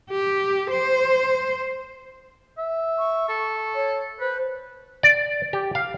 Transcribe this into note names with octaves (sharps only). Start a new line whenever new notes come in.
G4
C5
E5
C#6
A4
C#5
B4 C5
D5
G4
F5